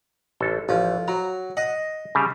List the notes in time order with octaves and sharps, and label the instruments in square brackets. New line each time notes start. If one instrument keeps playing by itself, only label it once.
[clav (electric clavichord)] A1 A4
[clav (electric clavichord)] A1 [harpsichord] F3
[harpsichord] F#3 [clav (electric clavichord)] A#5
[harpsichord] D#5 [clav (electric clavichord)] F#5
[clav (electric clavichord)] C#3 G3